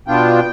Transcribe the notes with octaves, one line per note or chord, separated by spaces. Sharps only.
B2 B3 D4 F4 G5